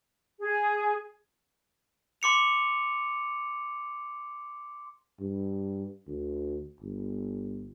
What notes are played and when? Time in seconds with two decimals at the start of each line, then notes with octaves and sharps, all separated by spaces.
0.40 G#4
2.22 C6 D6 C#7 F7
5.20 G2
6.07 D2
6.81 G1